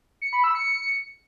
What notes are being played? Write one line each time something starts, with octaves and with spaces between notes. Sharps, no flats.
C#7
B5
E6
C#7